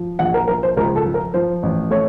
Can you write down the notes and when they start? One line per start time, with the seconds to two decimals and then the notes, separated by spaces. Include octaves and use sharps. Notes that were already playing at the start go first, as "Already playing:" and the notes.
Already playing: F3
0.19 A#1 F#5
0.34 A#4
0.48 F3 A#4
0.63 C5
0.77 C#2 A#4
0.96 A4
1.05 F3
1.14 A#4
1.34 F3 C5
1.63 A1
1.91 A3 C#5